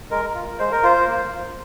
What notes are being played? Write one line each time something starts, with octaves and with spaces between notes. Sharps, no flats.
G#3 A#4
F4
G#3 C5
A#4
F4 C5
A#3
F4